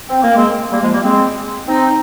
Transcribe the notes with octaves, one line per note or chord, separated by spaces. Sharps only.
C4
A#3
G#3 C4
G3 A#3
F3 G#3
G3 A#3
G#3 C4
C4 D#4